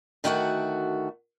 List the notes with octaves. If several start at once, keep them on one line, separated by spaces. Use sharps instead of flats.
D2 D#3 A3 F#4 C5 F#5